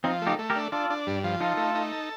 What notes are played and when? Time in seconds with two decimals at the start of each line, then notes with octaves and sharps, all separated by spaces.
0.04 F3 C4 D#4
0.22 A3
0.27 D#4 G4
0.39 A3
0.50 G4 A#4
0.56 D4
0.72 D4 F4 A4
0.90 D4
1.07 G2
1.24 F3
1.40 D#4 F4 A4
1.57 A3
1.75 D#4
1.92 A4